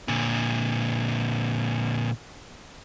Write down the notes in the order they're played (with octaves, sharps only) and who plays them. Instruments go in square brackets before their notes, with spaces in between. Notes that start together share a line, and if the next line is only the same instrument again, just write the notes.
[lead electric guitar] A#2 D3